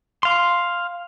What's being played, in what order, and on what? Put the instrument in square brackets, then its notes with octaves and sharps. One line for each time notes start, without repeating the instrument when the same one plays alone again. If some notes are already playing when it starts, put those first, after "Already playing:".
[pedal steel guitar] F5 C6